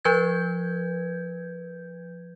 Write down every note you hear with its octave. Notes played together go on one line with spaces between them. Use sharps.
F3 B4 G6 G#6